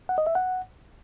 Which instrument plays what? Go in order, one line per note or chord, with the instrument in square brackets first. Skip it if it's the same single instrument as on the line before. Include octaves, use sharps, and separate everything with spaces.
[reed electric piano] F#5
D#5
E5
F#5